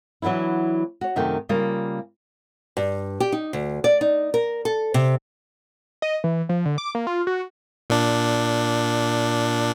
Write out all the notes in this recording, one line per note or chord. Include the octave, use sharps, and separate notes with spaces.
E3 F#3 B3 D4 E4
F#4 C#5
F#2 C3 D#3 A3 F#4 G5
C#3 G3 A#3 F4
G2
G4
D#4
D2
D5
D#4
A#4
A4
C3
D#5
E3
F3
D3
D6
A#3
F4
F#4
A#2 D4